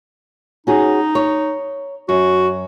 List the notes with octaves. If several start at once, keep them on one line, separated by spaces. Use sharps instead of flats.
C#4 D#4 F#4 G#4
C#5
F#2 F#4